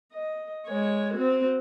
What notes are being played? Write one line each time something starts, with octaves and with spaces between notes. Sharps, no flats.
D#5
G#3 C#5
C4 F#4